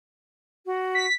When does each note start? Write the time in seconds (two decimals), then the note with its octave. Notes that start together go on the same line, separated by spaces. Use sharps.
0.65 F#4
0.95 B6